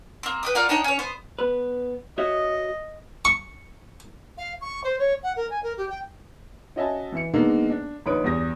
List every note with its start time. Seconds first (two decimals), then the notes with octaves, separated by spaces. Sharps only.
0.23 A#3 C4
0.43 B4 G5 D#6
0.55 F4 A#4 D5 F#5
0.69 D4 D#4 C#5 G5
0.84 C#4 C#5
0.99 B3 C5
1.39 B3 B4
2.18 F#4 C#5 D#5 E5
3.25 C#6
4.38 F5
4.61 C#6
4.84 C5
4.99 C#5
5.23 F#5
5.37 A#4
5.50 G#5
5.63 A#4
5.77 G4
5.90 G5
6.76 C#4 F#4 D#5 E5 G#5 A5
7.12 E3 E5 C#7
7.33 D3 D#3 G#3 A#3 B3 D#4
7.70 D4
8.06 A#1 D#3 B4 C#5 D#6 D7
8.24 E2 G2 G4 D#6 A#6